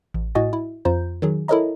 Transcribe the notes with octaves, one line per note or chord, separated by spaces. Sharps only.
A1
A2 F#4 D#5 G#5 A6
E4
F2 F4 C5 A#5 G6
D#3 F#3 G#4
E4 A4 A#4 C#5 D#5 A#5